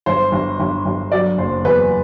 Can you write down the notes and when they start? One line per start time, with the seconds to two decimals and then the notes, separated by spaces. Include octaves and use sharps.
0.06 G1 C5
0.32 G1
0.60 G1
0.86 G1
1.12 F#3 D5
1.38 F#1 C5
1.64 E2 B4